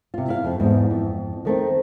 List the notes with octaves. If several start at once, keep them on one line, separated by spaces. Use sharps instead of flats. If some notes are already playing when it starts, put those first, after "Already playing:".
C3 F4
E4 F5
F2
E2 G#2
F2
D#3 A3 C4